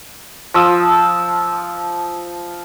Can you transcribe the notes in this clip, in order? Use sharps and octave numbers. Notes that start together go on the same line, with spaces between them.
F3 D#6 E6